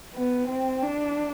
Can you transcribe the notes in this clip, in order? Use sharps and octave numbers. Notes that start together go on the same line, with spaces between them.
B3
C4
D4